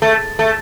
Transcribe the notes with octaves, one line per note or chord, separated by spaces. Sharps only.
A3
A3